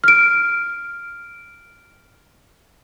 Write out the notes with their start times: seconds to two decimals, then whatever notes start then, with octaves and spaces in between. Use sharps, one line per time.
0.04 F6 D7